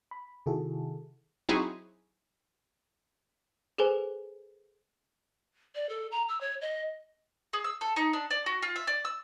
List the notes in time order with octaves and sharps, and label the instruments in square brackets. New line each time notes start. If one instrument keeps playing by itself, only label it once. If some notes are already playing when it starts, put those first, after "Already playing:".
[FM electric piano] B5
C3 D#3 E4 F#4 G#4 A4
[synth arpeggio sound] F#3 C4 D#4 E4 F#4 G#4
[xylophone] G#4 A4 B4 C5 G#5
[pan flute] D5
A4
A#5
E6
C#5
D#5
[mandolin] G#4
E6
A4
D#4
D4
D5
F#4
F4
E5
D5
E6